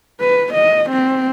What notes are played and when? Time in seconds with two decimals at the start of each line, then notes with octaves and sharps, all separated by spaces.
0.20 B4
0.54 D#5
0.90 C4